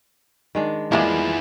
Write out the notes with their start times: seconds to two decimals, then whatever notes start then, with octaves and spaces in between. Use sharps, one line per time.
0.55 D#3 G#3 D4
0.92 E3 G3 G#3 A#3 B3 E4 F4 G#4